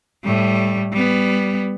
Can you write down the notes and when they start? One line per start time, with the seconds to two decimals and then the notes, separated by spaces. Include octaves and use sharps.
0.24 A2 G3
0.93 G3 B3